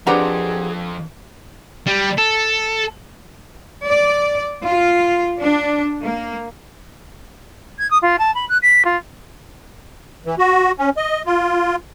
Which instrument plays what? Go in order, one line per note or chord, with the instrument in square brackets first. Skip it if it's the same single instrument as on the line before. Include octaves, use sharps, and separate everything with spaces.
[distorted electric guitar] F2 [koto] D4 B4 C5 [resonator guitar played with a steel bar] G4 F#5 A#5 [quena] G#4
[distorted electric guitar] G3
A4
[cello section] D5
F4
D4
A#3
[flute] G#6
D#6
F4
A5
B5
F#6
B6
F4
[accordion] E3
F#4
C#4
D#5
F4